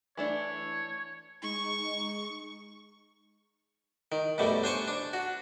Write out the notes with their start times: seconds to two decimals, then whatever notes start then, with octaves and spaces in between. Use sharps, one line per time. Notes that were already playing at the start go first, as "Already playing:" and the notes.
0.17 E3 A3 D4 C#5
1.42 G#3 D#4 C#6
4.12 D#3
4.38 F#2 B2 G3 A3
4.63 D4 C5 G#5 C#6
4.88 D4
5.13 F#4